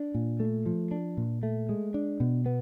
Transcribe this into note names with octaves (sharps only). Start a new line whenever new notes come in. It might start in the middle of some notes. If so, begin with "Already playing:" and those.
Already playing: D4
A#2
A3
F3
D4
A#2
A3
G#3
D4
B2
B3